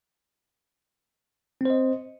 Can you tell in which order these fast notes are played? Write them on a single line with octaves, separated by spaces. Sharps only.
C4 C5 D#5